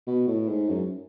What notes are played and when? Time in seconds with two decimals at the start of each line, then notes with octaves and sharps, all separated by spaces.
0.07 B2
0.28 A2
0.48 G#2
0.69 F#2